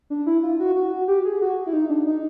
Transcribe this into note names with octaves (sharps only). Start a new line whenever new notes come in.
D4
E4
F4
F#4
F#4
F#4
G4
G#4
F#4
E4
D#4
D4
D#4